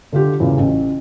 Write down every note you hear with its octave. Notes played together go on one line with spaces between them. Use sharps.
D3 F4 G4
E2 A#2 C#3
A1